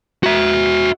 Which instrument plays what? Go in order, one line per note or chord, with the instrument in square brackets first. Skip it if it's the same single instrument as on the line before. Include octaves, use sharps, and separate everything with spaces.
[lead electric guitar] F#4 E5